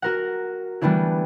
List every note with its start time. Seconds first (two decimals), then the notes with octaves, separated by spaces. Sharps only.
0.02 F#4 A#4 F#5
0.81 E3 G3 A3 B3 D4 E4